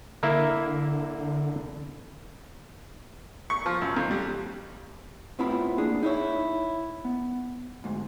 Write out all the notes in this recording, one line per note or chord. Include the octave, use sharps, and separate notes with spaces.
D3 A#3 E4 E5
C#6
F3
F#2
F2
G3
A2 B3 C4 E4 F4 B5
A#3 D4 G#4
D#4 E4 C#5
B3
D2 G#2